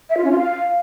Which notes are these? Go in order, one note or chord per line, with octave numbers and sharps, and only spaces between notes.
E5
F4
C#4
F4
F5